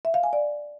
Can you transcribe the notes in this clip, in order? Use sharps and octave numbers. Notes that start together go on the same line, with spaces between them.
E5
F5
G#5
D5